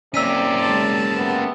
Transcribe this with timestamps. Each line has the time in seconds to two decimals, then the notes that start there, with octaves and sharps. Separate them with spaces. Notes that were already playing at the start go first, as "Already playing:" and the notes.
0.14 C3 A#3 C4 C#4 D5 E6 B6 D#7
0.61 G#3 A5
1.15 C3 B3